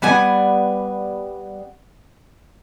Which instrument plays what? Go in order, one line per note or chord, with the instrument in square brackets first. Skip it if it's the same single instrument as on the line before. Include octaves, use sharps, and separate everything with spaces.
[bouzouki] G3 B3 F#5 G#5